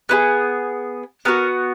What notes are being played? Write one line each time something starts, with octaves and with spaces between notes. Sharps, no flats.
B3 E4 G#4
B3 F#4 A#4